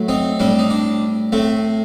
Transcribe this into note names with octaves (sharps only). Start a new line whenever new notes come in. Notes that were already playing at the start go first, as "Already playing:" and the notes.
Already playing: A2 F#3 A3
C4 D#4
A2 G3 C4 D4
D#4
D4
A2 A3 C4